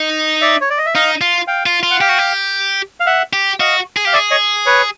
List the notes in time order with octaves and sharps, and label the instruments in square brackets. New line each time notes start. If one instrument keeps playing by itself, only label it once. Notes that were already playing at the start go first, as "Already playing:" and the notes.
Already playing: [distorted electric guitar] D#4
[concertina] D5 E5
C#5
D5
D#5
E5
[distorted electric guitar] D#4 [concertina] D#5 F5
[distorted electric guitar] F4
[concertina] F5 G5
[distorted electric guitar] F4
F4
[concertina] F#5
[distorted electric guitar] G4 [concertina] F5 G5
[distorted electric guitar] F#4
G4
[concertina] F5
E5 F#5
[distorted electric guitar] G4
[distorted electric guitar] F#4 [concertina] D#5 F5
[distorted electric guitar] G#4
[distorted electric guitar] G4 [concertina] F5
[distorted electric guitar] G#4 [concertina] D5 E5
[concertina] C#5 D#5
B4 C#5